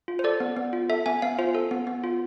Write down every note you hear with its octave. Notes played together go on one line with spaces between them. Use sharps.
F4
C5
A4 D5
B3
B3
F4
A4 E5
B3 G#5
B3 F5
F4 C5
A4
B3
B3
F4